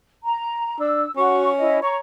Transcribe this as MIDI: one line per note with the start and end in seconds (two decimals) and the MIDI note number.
0.24 0.77 82
0.80 1.05 62
0.80 1.10 88
1.16 1.80 61
1.16 1.51 66
1.16 1.51 85
1.59 1.79 64
1.59 1.79 75
1.82 1.99 73
1.82 1.96 82
1.82 1.96 85